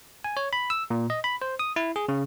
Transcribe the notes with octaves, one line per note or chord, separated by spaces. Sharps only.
G#5
C#5
B5
E6
A#2
D#5
B5
C5
D#6
E4
G#4
C#3